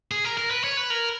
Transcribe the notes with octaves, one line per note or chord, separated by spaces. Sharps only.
G#4
A#4
A#4
B4
C#5
B4
A#4